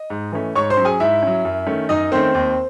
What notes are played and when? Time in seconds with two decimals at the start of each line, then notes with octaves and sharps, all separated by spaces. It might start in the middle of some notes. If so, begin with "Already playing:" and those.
Already playing: D#5
0.10 G#2
0.32 E3 A3 C#4
0.55 G#2 C#5 C#6
0.70 C5 C6
0.77 F#3 C#4
0.85 G#4 G#5
1.00 G#2 E4 E5
1.23 F#3 C#4
1.45 F#2
1.67 D#3 A3 C#4
1.89 F#2 D#4 D#5
2.12 D#3 A3 C4 C#4 C5
2.35 D#2